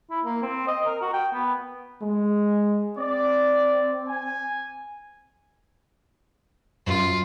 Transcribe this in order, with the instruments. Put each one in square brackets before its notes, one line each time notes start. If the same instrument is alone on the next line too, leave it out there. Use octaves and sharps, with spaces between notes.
[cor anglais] E4
A#3
C4
D#5
A#4
F#4
G5
B3
[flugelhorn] G#3
[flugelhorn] C4 [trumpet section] D5
[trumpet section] G#5
[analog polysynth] F#2 [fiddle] F4